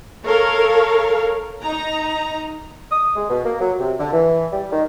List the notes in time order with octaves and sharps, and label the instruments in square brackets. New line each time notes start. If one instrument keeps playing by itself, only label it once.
[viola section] A4 A#4 C#5 F5
D#4 A#5
[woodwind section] D#6
G#3
B2
A#3
F#3
C3
D3
E3
G3
D#3